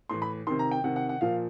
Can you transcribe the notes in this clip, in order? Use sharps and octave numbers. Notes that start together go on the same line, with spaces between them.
A2 E3 C6
B5
C3 D#3 C6
A#5
G5
C3 D#3 F#5
F#5
F#5
A#2 F3 F5